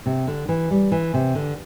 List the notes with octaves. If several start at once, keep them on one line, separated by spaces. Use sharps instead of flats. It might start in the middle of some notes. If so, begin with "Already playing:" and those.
C3
D3
E3
G3
E3
C3
D3